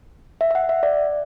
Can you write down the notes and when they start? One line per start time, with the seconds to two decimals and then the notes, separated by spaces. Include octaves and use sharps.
0.41 E5
0.51 E5
0.55 F#5
0.69 E5
0.83 D5